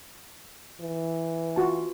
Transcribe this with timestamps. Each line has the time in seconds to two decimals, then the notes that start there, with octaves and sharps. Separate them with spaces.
0.81 E3
1.56 F4 F#4 A5